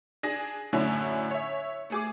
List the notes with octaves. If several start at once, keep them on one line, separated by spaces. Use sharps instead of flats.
D4 G#4 A#6 F#7
F#2 A2 D3 C#4 D4 E4
C#5 E5
A3 G#4 D6